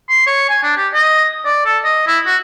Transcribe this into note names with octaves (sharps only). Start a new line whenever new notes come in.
C6
C#5
G#5
D4
G4
D#5
D5
A4
D#5
E4
F#4